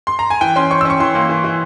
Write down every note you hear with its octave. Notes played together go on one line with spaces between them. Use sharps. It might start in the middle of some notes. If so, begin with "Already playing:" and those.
C6
A#5
G#5
E3 G5
C#4 C6
C#4 C#6
E6
C#4 C#6
E3 C6
A#3
E3
E3